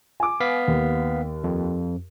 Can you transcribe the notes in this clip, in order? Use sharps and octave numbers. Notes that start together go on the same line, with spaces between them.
G#5 D6
B3 F5 B6
D#2
F2